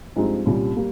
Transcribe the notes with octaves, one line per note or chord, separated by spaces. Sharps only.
G2 F3 G#3 C4 D#4
C2 A#2 G3 C#4
G3 A#3